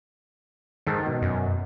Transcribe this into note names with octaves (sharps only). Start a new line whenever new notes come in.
G#2 D#3 A4 A5
B2
F#2